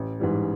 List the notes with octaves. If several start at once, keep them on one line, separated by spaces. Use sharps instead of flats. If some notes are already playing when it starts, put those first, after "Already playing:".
Already playing: A1
G#2 E3 G3